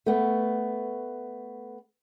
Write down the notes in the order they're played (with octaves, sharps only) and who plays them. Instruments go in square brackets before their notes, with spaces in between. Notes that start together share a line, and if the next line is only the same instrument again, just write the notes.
[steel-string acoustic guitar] A3 B3